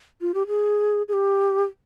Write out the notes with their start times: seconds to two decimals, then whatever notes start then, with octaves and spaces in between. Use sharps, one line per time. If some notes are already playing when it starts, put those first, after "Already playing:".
0.21 F4
0.34 G4
0.47 G#4
1.08 G#4
1.13 G4